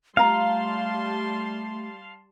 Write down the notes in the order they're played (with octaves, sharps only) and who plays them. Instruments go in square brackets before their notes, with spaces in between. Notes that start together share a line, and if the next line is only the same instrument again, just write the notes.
[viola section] G3 A5 C6 [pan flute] A3 [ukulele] F4 A#5 [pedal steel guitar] F5